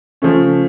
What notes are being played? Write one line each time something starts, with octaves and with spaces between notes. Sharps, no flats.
C#3 F3 A3 C#4